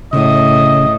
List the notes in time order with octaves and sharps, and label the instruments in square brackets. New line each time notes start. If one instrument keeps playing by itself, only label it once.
[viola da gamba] A2 [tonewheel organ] C#3 [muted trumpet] D#5